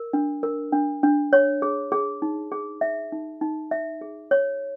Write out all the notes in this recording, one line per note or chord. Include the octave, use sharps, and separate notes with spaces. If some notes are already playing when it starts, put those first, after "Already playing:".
Already playing: A#4
D4
A#4
D4
D4
C#5
G#4
G#4
D#4
G#4
E5
D#4
D#4
E5
G#4
C#5